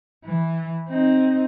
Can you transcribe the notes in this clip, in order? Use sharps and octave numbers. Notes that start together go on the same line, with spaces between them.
E3
C4 D#4